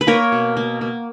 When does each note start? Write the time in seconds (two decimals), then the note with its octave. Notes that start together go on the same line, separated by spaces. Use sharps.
0.01 B4
0.07 A#3 A#4 C#5
0.32 B2
0.57 A#3
0.81 A#3